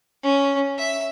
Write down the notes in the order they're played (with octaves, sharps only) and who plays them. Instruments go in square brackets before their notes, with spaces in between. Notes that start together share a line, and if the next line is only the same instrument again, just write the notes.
[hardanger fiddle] C#4
E5